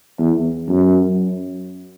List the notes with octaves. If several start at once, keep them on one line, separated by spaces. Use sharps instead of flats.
E2
F#2